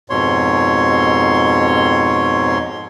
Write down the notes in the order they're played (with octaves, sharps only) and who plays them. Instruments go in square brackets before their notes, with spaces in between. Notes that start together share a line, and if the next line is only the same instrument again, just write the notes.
[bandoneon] F2 G#2 B2 C#5 C6